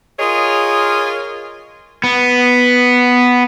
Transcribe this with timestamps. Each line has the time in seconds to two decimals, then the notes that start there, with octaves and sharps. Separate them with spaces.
0.19 F4 G#4 A#4 C#5 D#5
2.04 B3